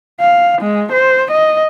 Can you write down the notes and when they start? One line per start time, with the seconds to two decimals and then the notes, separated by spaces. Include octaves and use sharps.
0.20 F5
0.61 G#3
0.92 C5
1.31 D#5